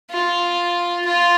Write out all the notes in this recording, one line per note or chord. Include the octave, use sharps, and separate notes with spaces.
F4
F4